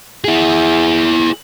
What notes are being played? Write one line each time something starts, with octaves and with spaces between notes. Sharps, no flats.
E4 G#4